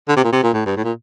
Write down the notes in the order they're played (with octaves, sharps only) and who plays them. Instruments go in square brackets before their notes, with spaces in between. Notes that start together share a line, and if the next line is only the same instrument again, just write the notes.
[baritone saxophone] D3
C3
A#2
C3
A#2
A2
G2
A2
A#2